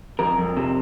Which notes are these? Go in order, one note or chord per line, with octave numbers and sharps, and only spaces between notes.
F2 A#4
F2
C3